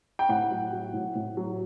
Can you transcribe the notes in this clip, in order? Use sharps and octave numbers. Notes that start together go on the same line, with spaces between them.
G5
A2 F#5
F#3
F#3
A2
A2
F#3